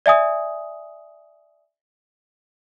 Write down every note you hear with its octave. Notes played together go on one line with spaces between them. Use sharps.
D5 E5 G#5 D#6